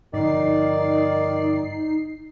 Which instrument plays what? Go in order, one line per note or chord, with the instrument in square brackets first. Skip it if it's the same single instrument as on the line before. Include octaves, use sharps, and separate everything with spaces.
[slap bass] G2 D3 F3 [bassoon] D#3 [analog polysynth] D#4 C7 [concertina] D5